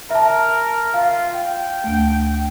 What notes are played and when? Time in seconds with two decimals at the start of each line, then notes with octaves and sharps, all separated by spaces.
0.10 A#4 E5 A5
0.94 F4 F5
1.34 G5
1.84 D2 A3